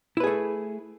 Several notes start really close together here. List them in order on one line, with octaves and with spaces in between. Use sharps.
E4 B4 G#4 A3